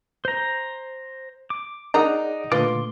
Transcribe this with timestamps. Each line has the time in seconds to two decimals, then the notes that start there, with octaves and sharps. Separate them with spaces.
0.25 C5 A#5
1.50 D6
1.94 D4 D#4 G#4 A#4 D5 F#5 A#5
2.52 A#2 D3 A3 F4 B4 C6 D6